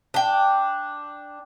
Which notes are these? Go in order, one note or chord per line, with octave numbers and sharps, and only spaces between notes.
D4 G5